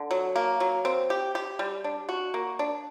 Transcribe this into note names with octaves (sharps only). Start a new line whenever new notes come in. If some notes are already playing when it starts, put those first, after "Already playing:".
Already playing: D3
F#3
A#3
F#3
C4
G4
G4
G3
D4
F#4
A#3
D4